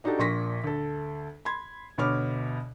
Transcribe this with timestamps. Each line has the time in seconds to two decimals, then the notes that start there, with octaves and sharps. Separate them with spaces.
0.04 D4 D#4 F#4 G4 A4
0.18 A#1 A#2 C6 C#6 A#6 B6
0.64 D2 A4
1.45 B5 C6 G#6
1.98 D2 B2 C#5 B5 D6 F6